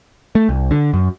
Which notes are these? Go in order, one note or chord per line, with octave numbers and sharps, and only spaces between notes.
A3
C2
D3
F#2